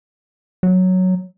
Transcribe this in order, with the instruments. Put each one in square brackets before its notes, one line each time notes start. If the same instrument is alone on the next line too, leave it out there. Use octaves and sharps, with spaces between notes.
[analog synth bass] F#3